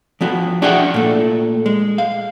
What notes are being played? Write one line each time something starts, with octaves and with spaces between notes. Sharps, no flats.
F3 B3 F#4
D4 F#4 G#4 E5 F#5 G5
A#2 A3
G#3
F5